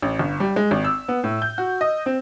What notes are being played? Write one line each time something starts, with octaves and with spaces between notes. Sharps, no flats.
A1
G1
G3
G#3
G#1
E6
B3
A2
G6
F#4
D#5
C4